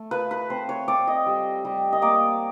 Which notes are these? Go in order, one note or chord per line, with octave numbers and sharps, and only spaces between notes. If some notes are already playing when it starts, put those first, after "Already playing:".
Already playing: A3
F4 B4
B4
C4 C5
C#5
C4 D5
D#5
G3
G3
D#5
A#3 D5